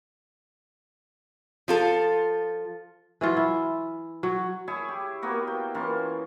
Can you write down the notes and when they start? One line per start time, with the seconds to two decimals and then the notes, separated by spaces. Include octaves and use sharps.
1.68 F3 F4 A4
3.21 E3 F#3 F4
3.37 E4
4.23 F#3
4.67 E4 G#4 C#5 C#6
4.89 G4
5.22 A#3 B3 F#4
5.47 G5
5.74 E3 A#3 C#4 F4